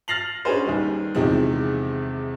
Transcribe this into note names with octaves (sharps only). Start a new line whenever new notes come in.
F6 A6 A#6 C7 F7 F#7
C#4 D4 F#4 G#4 B4 C5
D#2 D#3 G3
E2 C3 D#3 F3 G#3 C4